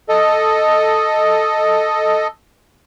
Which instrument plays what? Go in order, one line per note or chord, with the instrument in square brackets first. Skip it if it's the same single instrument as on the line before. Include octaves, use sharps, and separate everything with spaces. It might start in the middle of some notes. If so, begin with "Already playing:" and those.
[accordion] A4 D#5